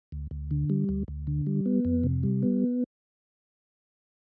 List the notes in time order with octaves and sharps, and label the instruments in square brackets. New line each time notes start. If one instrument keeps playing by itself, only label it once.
[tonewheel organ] D2
D2
D3
G3
D2
D2
D3
G3
B3
F2
C3
G3
B3